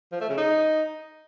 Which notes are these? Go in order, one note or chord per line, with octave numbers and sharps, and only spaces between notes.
F3
A3
C#3
D#4